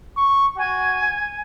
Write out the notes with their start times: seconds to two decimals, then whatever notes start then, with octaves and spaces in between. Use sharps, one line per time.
0.17 C#6
0.58 F#4 G#5